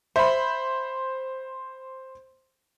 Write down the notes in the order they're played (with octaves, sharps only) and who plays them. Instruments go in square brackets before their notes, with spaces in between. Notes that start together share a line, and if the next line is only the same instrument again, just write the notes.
[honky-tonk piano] C5 B5 [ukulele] E5